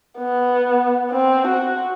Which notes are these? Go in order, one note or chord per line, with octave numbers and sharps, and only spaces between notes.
B3
C4
F#4